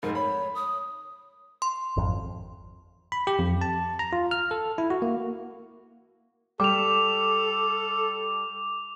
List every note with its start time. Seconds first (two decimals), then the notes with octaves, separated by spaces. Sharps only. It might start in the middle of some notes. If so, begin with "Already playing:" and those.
0.03 F1 G#2 A#4
0.15 C#5 B5
0.55 D#6
1.62 C6
1.97 G#1 F2
3.12 B5
3.27 G4
3.39 F2
3.61 A5
3.99 A#5
4.13 F4
4.31 F6
4.51 A4
4.78 E4
4.90 F#4
5.02 A#3
6.60 G3 A4 G5 D6 F7